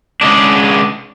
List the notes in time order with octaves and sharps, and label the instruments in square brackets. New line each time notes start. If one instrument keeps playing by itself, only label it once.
[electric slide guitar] C#3 G#3 D4